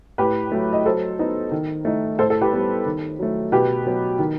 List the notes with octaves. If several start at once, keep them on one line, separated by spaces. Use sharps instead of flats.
A2 G4 B4
F#3 A3
D#5
F#3 A4 C5
B3 D#4
D#3
A3 D#4
A2 A4 C5
A4
G4 B4
G3 B3
D#3
F#3 A3
B2 G4 B4
F#3 B3
D#3